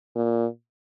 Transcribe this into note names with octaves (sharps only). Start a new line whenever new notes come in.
A#2